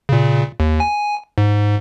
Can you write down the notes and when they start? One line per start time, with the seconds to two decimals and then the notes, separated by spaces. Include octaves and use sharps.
0.09 A#2 C#3
0.60 D#2
0.80 G#5
1.38 G#2